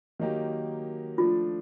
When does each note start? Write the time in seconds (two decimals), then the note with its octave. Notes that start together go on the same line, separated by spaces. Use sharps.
0.19 D#3 F#3 A#3 D#4 G4
1.18 F3 A3 D4 F4